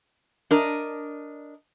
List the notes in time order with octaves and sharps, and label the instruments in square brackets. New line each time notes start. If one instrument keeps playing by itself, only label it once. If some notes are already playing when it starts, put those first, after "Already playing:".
[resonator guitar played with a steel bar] D4 A#4 D#5